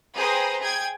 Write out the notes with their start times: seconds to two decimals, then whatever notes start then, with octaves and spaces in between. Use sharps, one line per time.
0.16 G#4 B4 C5 G5 A#5 D#6
0.61 G#4 G5 G#6